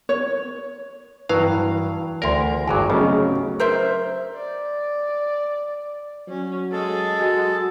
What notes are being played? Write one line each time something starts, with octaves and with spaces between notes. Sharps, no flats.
C#5
G2 E3 F#3 B4 F5
D2 A#4 D5 C6
G#1 G2 F#3 G#5 D6
C#3 F#3 A3 C#4 G4 G#4 D#5
A#4 C5 E5
D5
F#3 C#4
G#3 A4
F#4